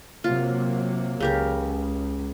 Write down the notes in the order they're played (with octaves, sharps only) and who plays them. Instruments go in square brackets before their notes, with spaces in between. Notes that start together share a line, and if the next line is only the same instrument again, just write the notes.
[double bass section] C3 F#3 A#3 [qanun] F4
[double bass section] C#2 [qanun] C#3 G4 A#4